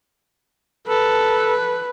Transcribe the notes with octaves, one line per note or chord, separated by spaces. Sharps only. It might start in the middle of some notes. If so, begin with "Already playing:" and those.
A4 B4